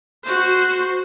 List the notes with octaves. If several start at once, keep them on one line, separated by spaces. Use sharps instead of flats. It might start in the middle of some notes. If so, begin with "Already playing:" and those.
F#4 C5